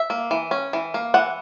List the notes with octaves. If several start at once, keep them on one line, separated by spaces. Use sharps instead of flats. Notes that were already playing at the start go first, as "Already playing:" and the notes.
Already playing: E5
A#3
E3
C#4
E3
A#3
E3 F#5